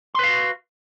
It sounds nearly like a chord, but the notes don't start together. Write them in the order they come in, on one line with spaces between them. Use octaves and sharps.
C6 B4 F5 F#4